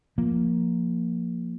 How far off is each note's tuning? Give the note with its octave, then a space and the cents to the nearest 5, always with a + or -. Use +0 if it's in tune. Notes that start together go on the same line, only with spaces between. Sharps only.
F3 +0 A#3 +0